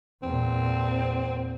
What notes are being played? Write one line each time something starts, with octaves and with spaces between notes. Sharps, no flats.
E2 A#2 C4